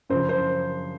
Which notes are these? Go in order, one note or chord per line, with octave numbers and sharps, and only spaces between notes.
F#2 C#3 F3 C5
C5